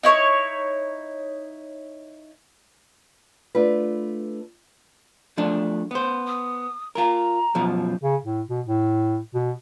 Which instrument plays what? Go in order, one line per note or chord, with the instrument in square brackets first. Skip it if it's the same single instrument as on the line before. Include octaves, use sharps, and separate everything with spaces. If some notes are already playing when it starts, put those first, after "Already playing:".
[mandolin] D#4 E4 C#5
[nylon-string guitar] A3 D4 F4 B4
[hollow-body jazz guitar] F3 A3 D4
B3 C5
[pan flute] D#6
[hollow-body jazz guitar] F4 A#4 [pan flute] A#5
[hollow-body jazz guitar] F#2 B2 F3
[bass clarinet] C#3
A2
B2
A2
B2